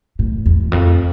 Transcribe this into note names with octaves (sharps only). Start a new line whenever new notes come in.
A2
E2
F2